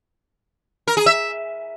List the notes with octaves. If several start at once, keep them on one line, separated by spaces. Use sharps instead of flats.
A#4
G#4
E5